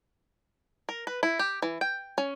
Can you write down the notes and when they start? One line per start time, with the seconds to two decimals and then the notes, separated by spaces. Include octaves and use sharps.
0.89 A#4
1.07 B4
1.23 E4
1.39 G4
1.62 E3
1.81 G5
2.18 C#4